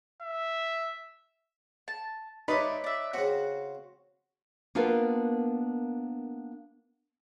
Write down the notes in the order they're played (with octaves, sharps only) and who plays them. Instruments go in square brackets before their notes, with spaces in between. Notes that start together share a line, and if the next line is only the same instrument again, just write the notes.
[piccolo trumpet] E5
[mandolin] A5
[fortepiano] D#4 B4 [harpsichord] C#5 C6 [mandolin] D5 E5
[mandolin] D5 E5
[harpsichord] C#3 C4 [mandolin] F#4
[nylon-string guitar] A#3 B3 D4 F4 A#4 B4